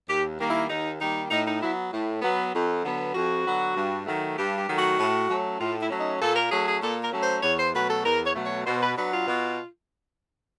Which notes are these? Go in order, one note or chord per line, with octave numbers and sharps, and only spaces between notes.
D#2 G4
D#3 G3 A#3
E4
D#2 D#4
D#3 G3 A#3 D#4
A2 D#4
D#4
F#3 B3 E4
A2
F#3 B3
F2
D3 F#3 B3
F2 F#4
D3 F#3 B3
G2
D#3 F#3 A3
G2 G4
G4
D#3 F#3 A3
F#4
A2
F#3 A3 C#4
A2 F4
E4
F#3 A3 C#4
D#4
A#2 A4
A#4
F#3 A3 C#4 G#4
G#4
A#2 A4
A#4
F#3 A3 C#4
C5
E2 C#5
C5
B2 F#3 A3 B4
A4
E2 A#4
C#5
B2 F#3 A3
C#5
B2 C5
B4
F#3 B3 D4 B4
F4
B2